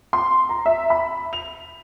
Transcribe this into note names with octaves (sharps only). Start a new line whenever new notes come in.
C6
A#5
E5
B5
F7